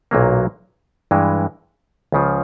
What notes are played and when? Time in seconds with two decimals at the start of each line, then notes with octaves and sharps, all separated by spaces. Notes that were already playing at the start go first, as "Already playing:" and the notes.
0.11 B1 A#2 F#3 A#3
1.11 G2 E3 G#3
2.12 C#2 C#3 F3